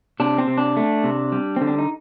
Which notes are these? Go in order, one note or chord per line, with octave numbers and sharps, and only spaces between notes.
C3 D4
C4
C3
D4
A3
C3
G3
D3 C4
D4
D#4